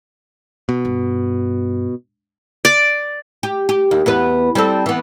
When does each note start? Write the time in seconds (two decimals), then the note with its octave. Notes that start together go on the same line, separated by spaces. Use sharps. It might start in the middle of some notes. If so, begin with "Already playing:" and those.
0.69 B2
0.85 G2
2.65 D5
3.43 G4
3.69 G4
3.91 D#2
4.06 E2 B3 B4
4.55 G3 C4 A4
4.86 E3 B3